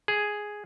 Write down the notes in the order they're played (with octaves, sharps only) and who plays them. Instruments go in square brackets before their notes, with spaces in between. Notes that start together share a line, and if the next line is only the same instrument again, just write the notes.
[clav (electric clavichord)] G#4